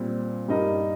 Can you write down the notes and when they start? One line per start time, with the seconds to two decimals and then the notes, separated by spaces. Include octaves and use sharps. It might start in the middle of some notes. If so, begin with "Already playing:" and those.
Already playing: A#2 G3 C4
0.48 G2 G3 D#4 A#4 D#5